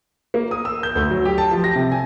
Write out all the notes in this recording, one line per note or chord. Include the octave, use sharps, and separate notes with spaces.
A#3
D#6
E6
G6
D2
F#3
G4
A5
F3
A#6
C3
G#5